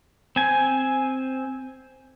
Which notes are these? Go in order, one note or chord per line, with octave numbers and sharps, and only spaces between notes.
C4 G#5